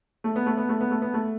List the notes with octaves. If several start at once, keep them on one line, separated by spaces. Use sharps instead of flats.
A3
B3
A3
B3
A3
B3
A3
B3
A3